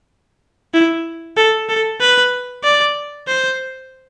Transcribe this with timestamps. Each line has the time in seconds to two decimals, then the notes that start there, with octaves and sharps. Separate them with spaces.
0.74 E4
1.37 A4
1.69 A4
2.01 B4
2.64 D5
3.28 C5